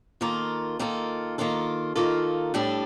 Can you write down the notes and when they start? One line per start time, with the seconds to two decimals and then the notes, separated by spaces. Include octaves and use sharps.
0.21 D#3 A#3 F4 A4
0.79 D#3 A#3 F4 A4
1.38 D#3 A#3 F4 A4
1.96 D#3 A#3 F4 A4
2.54 A2 G3 D4 A4